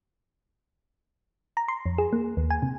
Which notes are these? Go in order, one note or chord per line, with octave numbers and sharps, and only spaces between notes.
A#5
C6
F2
G#4
A#3
D#2
G#5
C3